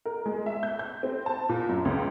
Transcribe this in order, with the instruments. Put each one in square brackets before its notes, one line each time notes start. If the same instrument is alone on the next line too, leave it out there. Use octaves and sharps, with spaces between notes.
[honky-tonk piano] A#4
G#3
E5
G6
G6
C4
A5
A#2
F#2
C#2